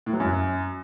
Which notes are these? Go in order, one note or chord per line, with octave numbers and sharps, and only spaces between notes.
A2
F#3
F#2